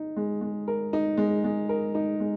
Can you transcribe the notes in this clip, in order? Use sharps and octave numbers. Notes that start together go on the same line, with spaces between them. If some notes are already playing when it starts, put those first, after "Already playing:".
Already playing: D#4
G#3
G#3
A#4
D#4
G#3
G#3
A#4
D#4
G#3